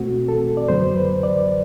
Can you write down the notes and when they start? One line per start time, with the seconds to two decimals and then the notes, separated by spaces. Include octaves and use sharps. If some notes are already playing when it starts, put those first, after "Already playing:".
Already playing: C2 B2 A3 C4 F#4
0.28 A4
0.57 D5
0.68 F#2 D3 F#3 B3 C5
0.96 B4
1.23 D5